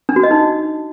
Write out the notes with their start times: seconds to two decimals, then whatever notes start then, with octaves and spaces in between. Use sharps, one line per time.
0.09 D4
0.16 F#4
0.23 D#5
0.31 D#4